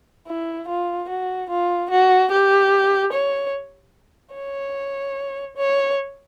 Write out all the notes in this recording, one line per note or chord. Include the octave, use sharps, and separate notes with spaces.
E4
F4
F#4
F4
F#4
G4
C#5
C#5
C#5